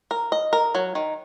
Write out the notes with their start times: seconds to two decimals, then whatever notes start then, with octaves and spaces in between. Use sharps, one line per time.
0.11 A#4
0.32 D#5
0.53 A#4
0.75 F#3
0.95 D#3